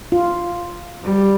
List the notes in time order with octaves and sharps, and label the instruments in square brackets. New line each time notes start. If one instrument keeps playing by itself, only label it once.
[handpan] F4
[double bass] G3